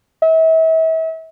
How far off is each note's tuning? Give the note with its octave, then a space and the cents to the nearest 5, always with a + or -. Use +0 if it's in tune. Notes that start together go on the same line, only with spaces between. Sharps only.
E5 -35